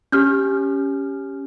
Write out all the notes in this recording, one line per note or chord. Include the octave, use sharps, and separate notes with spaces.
C#4 G4 F6 G6